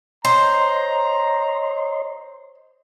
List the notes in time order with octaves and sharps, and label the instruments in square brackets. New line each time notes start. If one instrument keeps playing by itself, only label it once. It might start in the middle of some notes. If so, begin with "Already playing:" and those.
[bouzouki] C5 [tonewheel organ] C#5 D#5 C6 [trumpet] A#5